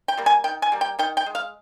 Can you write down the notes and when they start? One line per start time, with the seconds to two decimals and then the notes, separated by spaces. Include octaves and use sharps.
0.08 G5
0.17 G3 A#3
0.26 G#5
0.44 D#3 G5
0.62 G#5
0.72 G3 A#3
0.81 G5
0.99 D#3 G5
1.17 G5
1.26 G#3
1.35 F5